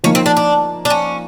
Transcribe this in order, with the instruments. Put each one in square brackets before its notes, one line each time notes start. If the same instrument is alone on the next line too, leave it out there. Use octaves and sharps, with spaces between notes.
[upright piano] F3 A#3 D#4 [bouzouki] C#4
[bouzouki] C4
D4
D4
D4
C#4